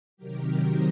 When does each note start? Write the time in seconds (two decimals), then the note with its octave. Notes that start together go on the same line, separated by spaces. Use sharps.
0.17 C3 D#3 F#3 G4 A#4
0.59 C5 D#5